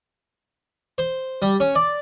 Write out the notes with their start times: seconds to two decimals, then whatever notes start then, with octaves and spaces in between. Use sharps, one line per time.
0.98 C5
1.42 G3
1.60 C#4
1.75 D5